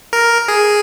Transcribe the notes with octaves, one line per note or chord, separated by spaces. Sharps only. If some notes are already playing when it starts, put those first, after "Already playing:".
A#4
G#4